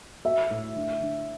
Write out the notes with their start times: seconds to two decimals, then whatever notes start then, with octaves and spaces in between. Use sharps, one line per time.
0.25 F#4 E5
0.50 A2
0.76 D3
1.02 D3